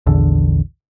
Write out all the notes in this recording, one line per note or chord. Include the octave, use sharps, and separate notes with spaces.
A#1 E2 D3